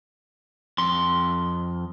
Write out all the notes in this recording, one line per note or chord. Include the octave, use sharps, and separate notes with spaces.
F2 C6